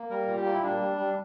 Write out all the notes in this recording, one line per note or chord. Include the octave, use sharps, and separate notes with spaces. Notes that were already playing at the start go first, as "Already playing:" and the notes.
Already playing: A#3
G3 A#4
A#2
G4
A#3
E4
G3 D4
G3
G3